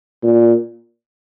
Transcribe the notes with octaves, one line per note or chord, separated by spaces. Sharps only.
A#2